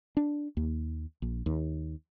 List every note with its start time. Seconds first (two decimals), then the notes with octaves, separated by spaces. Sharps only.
0.17 D4
0.57 D#2
1.22 A#1
1.46 D#2